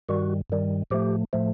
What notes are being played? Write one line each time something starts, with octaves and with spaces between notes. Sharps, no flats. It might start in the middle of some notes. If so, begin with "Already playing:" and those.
G2 D#3 G3 F#4
G2 D#3 G3
A2 F3 A3 G4
A2 F3 A3